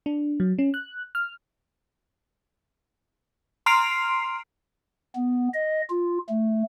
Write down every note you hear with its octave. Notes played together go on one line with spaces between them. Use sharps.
D4
F#3
C#4
F#6
F6
A#5 C6 F6 C7 D7 F7
B3
D#5
F4
A3